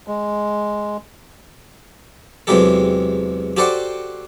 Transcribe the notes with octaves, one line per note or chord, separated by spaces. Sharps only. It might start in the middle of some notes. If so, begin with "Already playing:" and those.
G#3
E2 C3 F#3 G#3 G4 A4
F#4 G4 A4 C5 D5 F#5